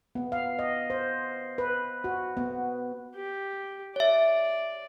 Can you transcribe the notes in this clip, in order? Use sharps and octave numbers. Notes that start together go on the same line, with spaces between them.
B3
F5
D#5
C5
B4
F#4
B3
G4
C#5 D5 E5